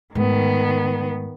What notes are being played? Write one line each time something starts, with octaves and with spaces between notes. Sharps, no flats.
G#2 D#3 A3 B3